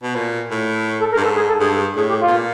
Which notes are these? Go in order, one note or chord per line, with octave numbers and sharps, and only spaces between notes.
B2
A#2
A2
A4
A#4
G2
G#2 A4
G#4
A4
G2 G#4
A2 G#4
G4
F4
B2
A#2